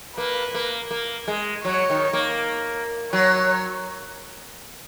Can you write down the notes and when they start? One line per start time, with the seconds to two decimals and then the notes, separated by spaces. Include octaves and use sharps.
0.17 A#3 B4
0.54 A#3
0.91 A#3
1.28 G#3
1.65 F#3 C#5
1.90 D#3
2.13 A#3
3.12 F#3 C#5